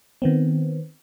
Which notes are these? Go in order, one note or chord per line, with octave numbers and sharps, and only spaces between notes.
D#3 B3 C4